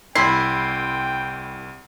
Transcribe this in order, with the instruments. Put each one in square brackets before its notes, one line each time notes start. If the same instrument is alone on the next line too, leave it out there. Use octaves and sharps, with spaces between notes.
[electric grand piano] C2 C6 C7 [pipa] E4 [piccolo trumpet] G5